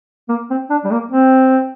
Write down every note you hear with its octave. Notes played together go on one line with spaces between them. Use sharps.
A#3
C4
D4
G3
A#3
C4